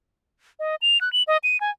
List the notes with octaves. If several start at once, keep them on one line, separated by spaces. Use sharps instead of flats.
D#5
F7
F#6
F#7
D#5
D#7
G#5